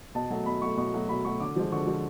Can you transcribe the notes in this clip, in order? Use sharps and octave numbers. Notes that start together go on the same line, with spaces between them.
B2 A5
F#3 A3
B2 B5
F#3 A3 C#6
B2 C#6
F#3 A3
B2 B5
F#3 A3 C#6
D3 D6
F3 G#3
D3 C#6
F3 G#3